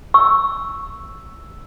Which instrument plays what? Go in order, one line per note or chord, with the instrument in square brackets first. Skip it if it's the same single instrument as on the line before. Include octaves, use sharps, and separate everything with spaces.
[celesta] C#6 [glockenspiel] E6